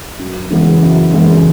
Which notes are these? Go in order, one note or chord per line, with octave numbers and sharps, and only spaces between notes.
F#2
C#3 E3 G#3 B3
F#2
C#3 E3 G#3 B3